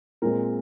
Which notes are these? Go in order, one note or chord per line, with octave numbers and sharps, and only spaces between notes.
A#2 G#3 C4 A#4